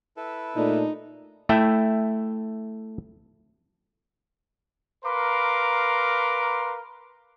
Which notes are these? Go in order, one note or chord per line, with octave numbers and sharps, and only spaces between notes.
E4 A4 B4
A#2 A3 D4 D#4
A3 E4 E5 G5
A#4 B4 F5 A#5 C6 D6